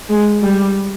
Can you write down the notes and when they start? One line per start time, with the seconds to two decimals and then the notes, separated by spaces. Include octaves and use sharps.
0.09 G#3
0.42 G3